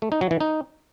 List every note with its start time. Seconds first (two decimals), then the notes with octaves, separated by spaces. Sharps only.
0.02 A3
0.12 D#4
0.21 F#3
0.31 E3
0.40 D#4